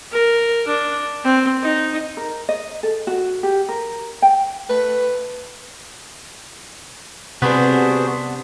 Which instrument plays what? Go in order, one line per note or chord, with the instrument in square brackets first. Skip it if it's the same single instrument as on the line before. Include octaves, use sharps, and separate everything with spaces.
[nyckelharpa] A#4
D4
C4
D#4
[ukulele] A#4
D#5
A4
F#4
G4
A#4
G5
[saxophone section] A3 B4
[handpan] C3 [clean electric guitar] B3 D4 [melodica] F#4 G#4 C5 [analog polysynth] B4